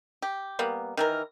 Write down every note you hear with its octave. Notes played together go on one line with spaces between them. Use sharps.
G4
G3 A#3 B3
D#3 E3 A#4